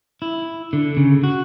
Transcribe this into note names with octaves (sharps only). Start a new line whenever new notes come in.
E4
D3
C#3
F#4